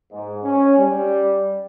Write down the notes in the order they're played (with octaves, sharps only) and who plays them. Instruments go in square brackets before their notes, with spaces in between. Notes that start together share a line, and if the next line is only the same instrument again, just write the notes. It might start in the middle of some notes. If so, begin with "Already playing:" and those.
[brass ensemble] G#2
C#4
G3